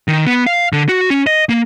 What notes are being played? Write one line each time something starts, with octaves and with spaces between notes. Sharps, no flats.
D#3
B3
F5
D3
F#4
C#4
D#5
A#3